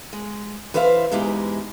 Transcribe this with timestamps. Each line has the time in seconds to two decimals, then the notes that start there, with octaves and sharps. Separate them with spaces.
0.13 G#3
0.74 E3 B4 C5 E5 F5
1.11 E2 G#2 G#3 D#4 E4 G4